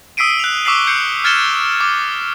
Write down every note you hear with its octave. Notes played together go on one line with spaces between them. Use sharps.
D#6 E6 B6 C7 D7 D#7
F#6 F7
C#6 D6 E6 B6 C7 F#7
G6 C7 C#7
F6 G#6 A6 C#7 E7 G7
D6